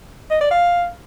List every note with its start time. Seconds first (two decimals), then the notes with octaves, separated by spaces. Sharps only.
0.31 D#5
0.41 D5
0.51 F5